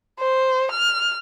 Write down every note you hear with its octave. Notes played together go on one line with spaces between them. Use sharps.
C5
F6